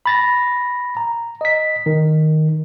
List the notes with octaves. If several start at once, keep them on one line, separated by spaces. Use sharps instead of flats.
B5 A6 A#6
A#5
D#5 B6
D#3